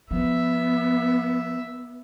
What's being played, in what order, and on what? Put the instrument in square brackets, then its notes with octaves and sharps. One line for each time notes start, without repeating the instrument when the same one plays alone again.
[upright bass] F3 [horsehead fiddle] B3 [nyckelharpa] E5